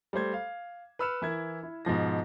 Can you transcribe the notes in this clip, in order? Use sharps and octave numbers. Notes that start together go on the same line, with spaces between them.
G3 A3 C5 G#6
F5
B4 B5 E6 F6 C#7 E7
E3 E4 A#4 G#6
E4
G#2 B2 F3 A#6